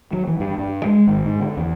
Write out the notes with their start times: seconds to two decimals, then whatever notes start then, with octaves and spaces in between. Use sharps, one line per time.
0.13 F#3
0.27 E3
0.40 G2
0.58 G2
0.85 G#3
1.07 G#1
1.25 G#2
1.40 D3
1.57 E2